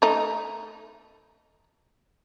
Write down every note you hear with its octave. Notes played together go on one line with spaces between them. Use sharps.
A3 D#4